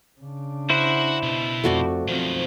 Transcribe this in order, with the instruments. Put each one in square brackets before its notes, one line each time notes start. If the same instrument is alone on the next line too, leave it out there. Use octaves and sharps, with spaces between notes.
[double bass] C#3 D4
[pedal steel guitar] E4 C5 [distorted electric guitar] F#4 F#5
[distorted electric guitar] B2
[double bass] F2 [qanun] A3 F#4 D5
[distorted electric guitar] B1 D#3 [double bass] F3 C4